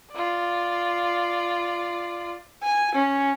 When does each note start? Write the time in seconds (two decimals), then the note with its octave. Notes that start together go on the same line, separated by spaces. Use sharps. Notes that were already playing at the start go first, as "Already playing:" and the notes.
0.12 F4 D5
2.63 G#5
2.95 C#4